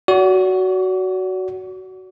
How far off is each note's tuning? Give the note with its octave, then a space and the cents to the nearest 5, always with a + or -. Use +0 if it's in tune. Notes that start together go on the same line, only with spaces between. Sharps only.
F#4 +10 D5 -45